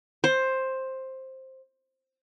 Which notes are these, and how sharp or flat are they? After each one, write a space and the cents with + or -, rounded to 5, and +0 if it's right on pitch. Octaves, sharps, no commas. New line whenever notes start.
C5 +10